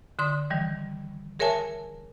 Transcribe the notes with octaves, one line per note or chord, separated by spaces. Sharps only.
D3 C6 D#6
D#3 E3 G3
G#4 A#4 C#5 E5 G#5 A5